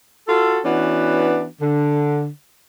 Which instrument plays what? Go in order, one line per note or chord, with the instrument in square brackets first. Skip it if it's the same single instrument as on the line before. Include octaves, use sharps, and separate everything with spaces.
[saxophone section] F4 F#4 A4
E3 B3 C#4 D4 F#4
D3